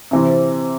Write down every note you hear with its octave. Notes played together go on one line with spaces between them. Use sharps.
C3 E3 C4